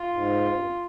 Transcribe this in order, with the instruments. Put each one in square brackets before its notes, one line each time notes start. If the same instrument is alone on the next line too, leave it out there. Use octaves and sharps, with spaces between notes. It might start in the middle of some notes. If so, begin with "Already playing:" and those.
Already playing: [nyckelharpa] F4
[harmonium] G#2
G2
F2